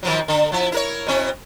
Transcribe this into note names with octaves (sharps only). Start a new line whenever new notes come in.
D#3 F3 F#3
D3
F3 E4
E4 A#4 C#5
B2 C4 E4